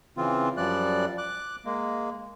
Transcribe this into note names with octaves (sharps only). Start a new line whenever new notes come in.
C#3 E3 C4 F4
F#2 F3 G3 D5 F#6
D6 F#6
G#3 A#3